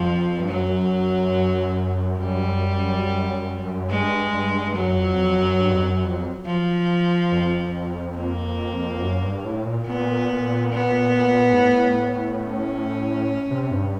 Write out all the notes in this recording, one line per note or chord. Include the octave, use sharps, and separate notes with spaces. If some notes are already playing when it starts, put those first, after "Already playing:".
Already playing: F2 F3
G2
F#2 F#3
F#2 G3
G2 G#3
G2
F#2 F#3
F#2
F2
F2
F#2
G2
F2
F#2
F2
F3
F2
A#3
F#2
G2
A2
A#2
A#2 B3
B3
G#2
A2
C#4
C3
G2